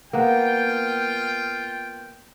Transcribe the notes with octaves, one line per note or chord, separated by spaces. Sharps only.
A#3 B3 F4 B4 G5